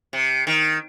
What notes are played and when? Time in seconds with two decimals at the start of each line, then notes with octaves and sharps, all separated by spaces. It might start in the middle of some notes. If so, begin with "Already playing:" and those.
0.13 C3
0.47 D#3